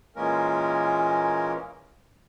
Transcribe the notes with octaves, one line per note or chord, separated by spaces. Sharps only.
A#2 E3 G#3 A#3 C#4 A#4